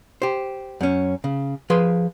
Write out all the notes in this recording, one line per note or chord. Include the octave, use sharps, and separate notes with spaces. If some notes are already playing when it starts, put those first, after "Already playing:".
G4 C5
F#2 C#4
C#3
F3 G#4 B4 C6